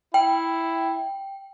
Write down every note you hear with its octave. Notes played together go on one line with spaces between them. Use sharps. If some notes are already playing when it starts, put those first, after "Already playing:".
E4 G5